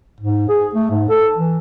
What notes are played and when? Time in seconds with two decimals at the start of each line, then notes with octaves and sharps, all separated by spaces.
0.20 G#2
0.49 G#4
0.75 A3
0.90 G#2
1.09 A4
1.37 E3